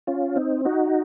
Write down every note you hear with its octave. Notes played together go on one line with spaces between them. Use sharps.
C#4 F4
C4 D#4
D#4 F#4